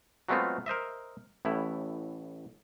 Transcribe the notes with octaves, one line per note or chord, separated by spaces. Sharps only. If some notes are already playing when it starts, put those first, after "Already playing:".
F#3 G#3 A3 B3 C4 F4
A#4 C5 D#5 E5
A1 A2 E4